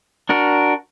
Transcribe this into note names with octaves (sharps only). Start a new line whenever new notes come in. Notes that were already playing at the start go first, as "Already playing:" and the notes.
D4 F#4 A#4